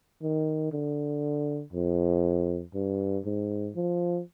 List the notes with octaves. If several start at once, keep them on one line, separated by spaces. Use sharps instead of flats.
D#3
D3
F2
G2
G#2
F3